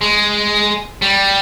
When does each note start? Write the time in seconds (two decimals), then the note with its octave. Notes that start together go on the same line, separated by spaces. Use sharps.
0.01 G#3
1.02 G3